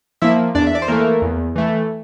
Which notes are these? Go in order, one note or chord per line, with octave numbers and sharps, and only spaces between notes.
F3 A#3 E4 E5
E2 D4 D5
E5
D5
C5
E3 A3 A#3 A#4
E2
E3 A3